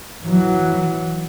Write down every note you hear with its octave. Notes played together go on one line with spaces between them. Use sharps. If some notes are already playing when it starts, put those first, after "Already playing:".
E3 F#3